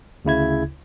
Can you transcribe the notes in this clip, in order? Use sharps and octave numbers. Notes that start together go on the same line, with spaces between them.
D2 C#3 E4 G#6